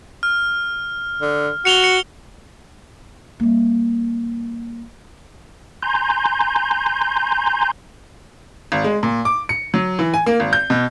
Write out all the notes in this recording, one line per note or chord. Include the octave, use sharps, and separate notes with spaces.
F6
D3
F#4 C#7 F7 G7
C#7
G3 A#3
G#5 A#5 C6 G6
G#1
G#3
A#2
D6
C#7
F#3
E3
G#5
A#3
G#1
G6
B2